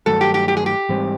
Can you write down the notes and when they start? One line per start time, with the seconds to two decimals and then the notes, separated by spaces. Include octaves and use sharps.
0.06 G2 D#3 F#3 A3 A4
0.21 G4
0.34 G4
0.48 G4
0.57 G#4
0.66 G4
0.89 G#2 E3 G3 C4